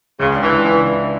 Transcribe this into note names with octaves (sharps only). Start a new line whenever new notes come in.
C#2 C#3
D4
E3
C#2
D4